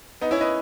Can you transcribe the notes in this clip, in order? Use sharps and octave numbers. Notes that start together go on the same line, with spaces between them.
B3 D#4
C#4 E4
B4 D#5